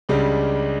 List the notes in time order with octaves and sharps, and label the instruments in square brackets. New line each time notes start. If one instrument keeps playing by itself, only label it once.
[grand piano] C#2 C#3 G3 D4